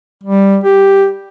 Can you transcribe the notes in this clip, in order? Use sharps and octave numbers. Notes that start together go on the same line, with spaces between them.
G3
G4